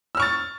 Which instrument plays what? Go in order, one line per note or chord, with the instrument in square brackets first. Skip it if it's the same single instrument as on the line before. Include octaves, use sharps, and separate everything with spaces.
[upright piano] E6
F6
C#6
A6